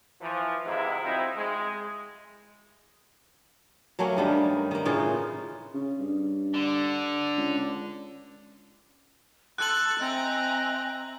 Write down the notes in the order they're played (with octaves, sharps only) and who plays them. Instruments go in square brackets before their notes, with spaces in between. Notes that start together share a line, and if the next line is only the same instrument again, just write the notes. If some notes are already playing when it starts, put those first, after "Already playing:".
[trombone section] E3 F3
G#2 C3 D#3 G#3 A#3 E4
F3 F#3 C4 D#4 E4
G#3
[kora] F#3 A3 A#3 C#4
G2 D#3 G3
D#3 A#3
A2 C#3 E3 F4
[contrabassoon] C#3
G2
[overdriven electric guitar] D3
[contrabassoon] C#2
[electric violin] A4 A5 [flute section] C6 E6 [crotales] F#6 F#7
[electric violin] C4 A#5 [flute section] D#5 E5 G#5